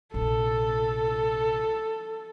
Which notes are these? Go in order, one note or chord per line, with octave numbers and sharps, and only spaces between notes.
A#1 C3 A4